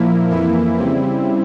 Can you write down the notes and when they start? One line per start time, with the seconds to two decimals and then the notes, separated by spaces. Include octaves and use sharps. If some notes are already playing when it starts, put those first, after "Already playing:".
Already playing: A#2 F3 A#3 E4
0.30 F2 E3 A#3 E4
0.77 C#3 G3 C4 E4